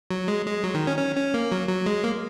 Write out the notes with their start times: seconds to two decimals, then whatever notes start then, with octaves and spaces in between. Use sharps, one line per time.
0.11 F#3
0.28 G#3
0.46 G#3
0.64 F#3
0.75 D#3
0.87 C#4
0.98 C#4
1.15 C#4
1.34 A#3
1.52 F#3
1.69 F#3
1.86 G#3
2.04 A#3